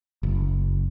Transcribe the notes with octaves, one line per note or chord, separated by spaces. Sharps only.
F#1